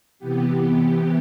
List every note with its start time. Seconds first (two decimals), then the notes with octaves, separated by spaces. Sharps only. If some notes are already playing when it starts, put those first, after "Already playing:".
0.19 C3 E3 B3 G4